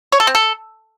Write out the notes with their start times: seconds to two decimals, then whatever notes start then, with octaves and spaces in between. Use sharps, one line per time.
0.12 C#5
0.20 A4
0.27 C4
0.35 A4